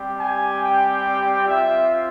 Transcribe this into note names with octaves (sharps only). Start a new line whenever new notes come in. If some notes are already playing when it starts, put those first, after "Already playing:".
Already playing: G3 C4 G4
G#5
G5
C4 F4 E5